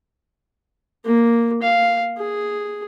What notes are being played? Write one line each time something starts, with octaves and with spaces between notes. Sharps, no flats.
A#3
F5
G#4